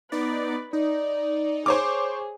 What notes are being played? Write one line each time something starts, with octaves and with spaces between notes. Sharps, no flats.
B3 D#4 B4 D5
D#4 D5
G#4 C5 C#5 D6